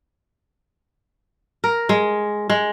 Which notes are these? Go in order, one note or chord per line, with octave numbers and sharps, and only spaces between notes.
A#4
G#3
G#3